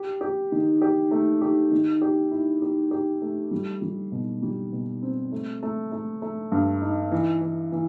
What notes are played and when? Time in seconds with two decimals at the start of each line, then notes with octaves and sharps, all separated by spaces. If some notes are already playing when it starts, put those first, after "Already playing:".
Already playing: G4
0.21 G4
0.52 D#3
0.82 G4
1.11 A3
1.42 G4
1.71 D#3
2.02 G4
2.31 E4
2.62 G4
2.91 G4
3.22 A3
3.51 G3
3.82 G3
4.12 B2
4.42 G3
4.72 B2
5.03 C4
5.32 A3
5.63 A3
5.92 A3
6.22 A3
6.52 G2
6.82 D#4
7.12 E3
7.42 E3
7.72 E3